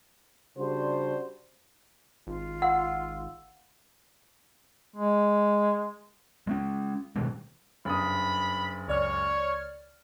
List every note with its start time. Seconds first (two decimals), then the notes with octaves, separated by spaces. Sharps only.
0.57 C#3 G3 D4 F#4 C5
2.27 G#1 F4
2.62 F5 F#5 E6
4.96 G#3
6.47 G#3 B3 C#4
7.16 B2 D#3 G3 G#3
7.85 F#1 G2 B5 D#6
8.88 C#2 C#5 D5 F6